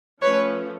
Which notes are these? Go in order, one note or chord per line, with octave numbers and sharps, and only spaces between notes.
F3 A3 C#4 B4 C#5